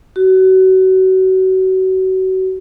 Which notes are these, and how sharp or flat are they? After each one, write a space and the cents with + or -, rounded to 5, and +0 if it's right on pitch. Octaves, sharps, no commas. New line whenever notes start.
F#4 +30